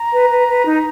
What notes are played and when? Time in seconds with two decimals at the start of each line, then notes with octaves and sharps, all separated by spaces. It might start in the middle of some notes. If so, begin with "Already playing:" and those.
Already playing: A#5
0.12 B4
0.29 B4
0.47 B4
0.65 D#4